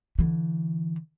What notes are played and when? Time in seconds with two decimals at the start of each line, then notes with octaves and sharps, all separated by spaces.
0.19 D3 E3